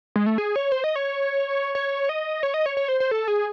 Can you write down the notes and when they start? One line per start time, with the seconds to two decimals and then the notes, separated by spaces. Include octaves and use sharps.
0.16 G#3
0.26 A3
0.38 G#4
0.56 C#5
0.72 C5
0.84 D#5
0.96 C#5
1.75 C#5
2.09 D#5
2.43 C#5
2.54 D#5
2.66 C#5
2.77 C#5
2.88 C5
3.00 C5
3.11 A4
3.28 G#4